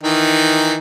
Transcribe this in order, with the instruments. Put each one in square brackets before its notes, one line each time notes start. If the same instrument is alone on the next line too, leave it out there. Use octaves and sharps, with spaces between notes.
[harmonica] D#3 E3 D#4